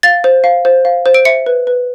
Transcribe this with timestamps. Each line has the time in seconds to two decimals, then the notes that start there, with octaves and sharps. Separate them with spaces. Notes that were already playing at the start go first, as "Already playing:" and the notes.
0.03 F5 A6
0.24 C5
0.44 F5
0.65 C5
0.85 F5
1.06 C5
1.14 D7
1.25 E5 C#7
1.46 B4
1.67 B4